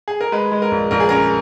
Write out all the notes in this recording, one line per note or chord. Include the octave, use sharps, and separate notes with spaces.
G#4
A#4
G#3 B4
G#3
A#4
A#1
A#1 A#4
G#4
C#4 A#4